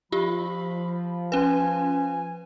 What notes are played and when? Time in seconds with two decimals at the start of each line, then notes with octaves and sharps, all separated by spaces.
0.12 F3 F4 G4 B5
1.32 C#4 B4 G#5